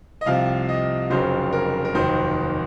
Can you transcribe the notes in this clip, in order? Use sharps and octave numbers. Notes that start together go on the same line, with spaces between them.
D#5
C2 C3 F3 F5
D#5
F1 F2 C#3 F#3 C5
A#4
A#4
F1 D#2 D#3 F#3 C5